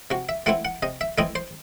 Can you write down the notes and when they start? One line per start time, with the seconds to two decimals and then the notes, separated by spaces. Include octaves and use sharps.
0.11 C3 F#4
0.29 E5
0.46 E3 A3 C4 E4 F#5
0.65 F#5
0.83 C3 D#5
1.01 E5
1.18 E3 A3 C4 E4 D#5
1.35 C5